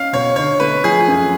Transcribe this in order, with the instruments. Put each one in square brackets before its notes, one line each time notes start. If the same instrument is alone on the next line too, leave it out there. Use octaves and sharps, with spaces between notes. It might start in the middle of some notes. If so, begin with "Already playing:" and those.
Already playing: [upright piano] C#4 [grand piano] F5
[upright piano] B2 [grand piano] C#5
[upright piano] D3 [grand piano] C#5
[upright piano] A3 [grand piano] B4
[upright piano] F3 [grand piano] G#4
[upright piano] F#2